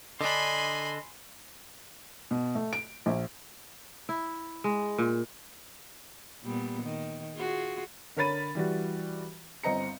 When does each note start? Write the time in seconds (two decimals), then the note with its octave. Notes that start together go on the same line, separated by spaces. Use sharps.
0.21 D3 D4 D#5 G#5 B5 C6
2.31 B2
2.55 A3
2.73 D7
3.06 A#1
4.09 E4
4.64 G#3
4.98 A#2
6.43 A#2 G3 B3
6.82 D#3
7.36 F4 F#4 G#4
8.16 D3 A#4 C#5 B5 A6 D#7
8.55 E3 G3 F#4
9.63 G1 C4 D#5 A#5 C#7